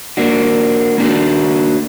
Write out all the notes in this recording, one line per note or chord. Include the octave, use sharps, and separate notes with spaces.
A#3 D4 F#4
A#3 D4 F#4